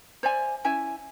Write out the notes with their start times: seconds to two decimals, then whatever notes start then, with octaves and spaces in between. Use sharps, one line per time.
0.23 C5 D5 E5 G#5
0.64 C#4 E4 E5 G#5